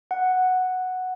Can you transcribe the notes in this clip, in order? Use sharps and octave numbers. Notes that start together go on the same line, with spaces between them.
F#5